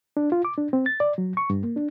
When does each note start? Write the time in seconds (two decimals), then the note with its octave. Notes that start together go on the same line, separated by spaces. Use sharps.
0.17 D4
0.32 F4
0.45 D6
0.58 D4
0.73 C4
0.86 A6
1.00 D5
1.18 F#3
1.37 C#6
1.50 G2
1.64 A#3
1.76 D4